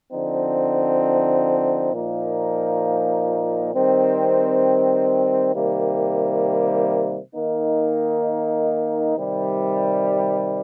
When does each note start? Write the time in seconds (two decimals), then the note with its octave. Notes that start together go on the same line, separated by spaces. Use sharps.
0.12 D3 F3 C4 D#4
1.93 A#2 F3 A#3 D#4
3.74 D#3 G3 C4
5.55 C3 D#3 G3 A#3
7.35 D#3 A#3 D#4
9.16 C3 D#3 G3